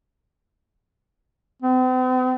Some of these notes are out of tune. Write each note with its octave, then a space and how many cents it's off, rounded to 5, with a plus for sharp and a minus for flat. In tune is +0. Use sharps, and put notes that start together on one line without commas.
C4 -45